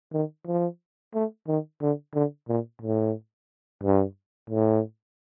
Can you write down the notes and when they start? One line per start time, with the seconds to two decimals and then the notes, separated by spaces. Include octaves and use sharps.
0.13 D#3
0.47 F3
1.15 A3
1.48 D#3
1.82 D3
2.14 D3
2.49 A#2
2.82 A2
3.83 G2
4.50 A2